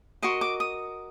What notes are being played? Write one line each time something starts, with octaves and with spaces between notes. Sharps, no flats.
F#4 A#4 D#5 C6
D6
D#6